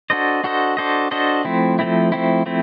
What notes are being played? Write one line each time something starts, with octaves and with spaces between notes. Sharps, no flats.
D4 F#4 A4 C5 D#5
D4 F#4 A4 C5 D#5
D4 F#4 A4 C5 D#5
D4 F#4 A4 C5 D#5
F3 A3 C4 E4
F3 A3 C4 E4
F3 A3 C4 E4
F3 A3 C4 E4